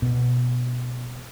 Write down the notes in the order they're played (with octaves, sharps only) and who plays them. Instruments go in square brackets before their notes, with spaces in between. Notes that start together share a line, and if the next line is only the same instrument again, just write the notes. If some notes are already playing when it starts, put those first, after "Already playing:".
[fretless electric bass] B2